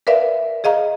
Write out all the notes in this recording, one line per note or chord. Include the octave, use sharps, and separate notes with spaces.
A#4 B4 D5 E5 F5
G#4 D#5 F5 A#5